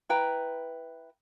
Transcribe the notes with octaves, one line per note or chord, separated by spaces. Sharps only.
E4 B4 G5 A#5